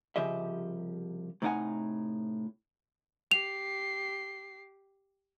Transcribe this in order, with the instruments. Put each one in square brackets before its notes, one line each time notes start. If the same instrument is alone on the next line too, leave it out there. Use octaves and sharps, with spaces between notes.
[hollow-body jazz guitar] C2 C#3 F3 G4 D#5 E5
A2 C3 D#4 D5 F#5 G#5
[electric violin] G4 C7 [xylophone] F7